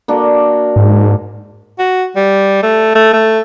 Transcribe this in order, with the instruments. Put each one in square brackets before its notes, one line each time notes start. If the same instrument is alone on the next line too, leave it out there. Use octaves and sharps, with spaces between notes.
[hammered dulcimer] A#3 D4 F#4
[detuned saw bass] G#2
[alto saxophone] F#4
G3
A3
A3
A3